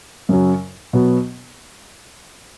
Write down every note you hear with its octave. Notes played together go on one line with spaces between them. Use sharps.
F#2 C#3 F#3
B2 F#3 B3